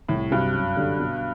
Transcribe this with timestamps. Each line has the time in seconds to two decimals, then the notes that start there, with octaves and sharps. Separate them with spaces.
0.09 C2 A2
0.31 G2 C3 F#3
0.54 F#2
0.77 D3 G3
1.00 B2